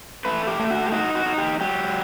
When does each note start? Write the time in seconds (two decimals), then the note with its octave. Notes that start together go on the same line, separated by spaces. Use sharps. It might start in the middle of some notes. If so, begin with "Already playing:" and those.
0.25 A3 B4
0.47 G4
0.59 A3
0.71 F#4
0.86 G4
0.92 D#4 F#4
1.15 F#4
1.26 D#4
1.38 G4
1.61 F#3 G4